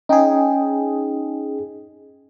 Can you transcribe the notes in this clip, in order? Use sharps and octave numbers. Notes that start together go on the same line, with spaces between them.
C#4 D#4 G#4 D#5 G5